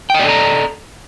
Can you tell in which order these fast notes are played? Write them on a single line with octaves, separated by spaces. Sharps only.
G5 D#5 D5 A4 A#5